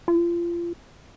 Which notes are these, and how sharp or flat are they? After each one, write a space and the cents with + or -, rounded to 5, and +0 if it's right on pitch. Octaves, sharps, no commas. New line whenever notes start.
F4 -30